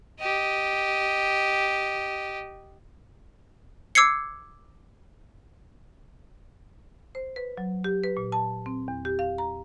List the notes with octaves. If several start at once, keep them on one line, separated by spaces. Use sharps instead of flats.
G4 D#5
D6 E6 G#6 C7 C#7
C5
B4
F#3
G4
B4
A#2
A5
C4
E2
G4
F5
A#5